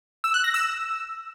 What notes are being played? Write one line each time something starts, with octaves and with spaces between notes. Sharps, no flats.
E6
F#6
A#6
E6